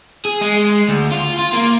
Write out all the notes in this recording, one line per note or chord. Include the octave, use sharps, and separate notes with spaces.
G#4
G#3
D2
F4
F4
A#3